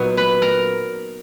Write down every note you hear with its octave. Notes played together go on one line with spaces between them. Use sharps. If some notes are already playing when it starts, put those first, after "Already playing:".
Already playing: A#2 F#3 B3 D#4 F#4
B4 B5
A#4 A#5